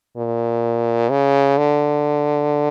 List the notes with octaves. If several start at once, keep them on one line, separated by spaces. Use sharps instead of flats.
A#2
C#3
D3